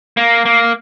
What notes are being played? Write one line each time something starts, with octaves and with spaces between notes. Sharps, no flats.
A#3
A#3